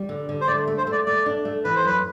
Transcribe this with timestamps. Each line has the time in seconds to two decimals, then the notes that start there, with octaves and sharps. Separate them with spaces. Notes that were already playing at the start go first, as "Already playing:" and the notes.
Already playing: G3
0.09 D3
0.29 D3
0.41 C5
0.47 A3 D5
0.67 A3
0.78 C5
0.87 A3
0.92 D5
1.06 A3 D5
1.26 D4
1.45 A3
1.64 E3 B4
1.75 C5
1.84 F#2 B4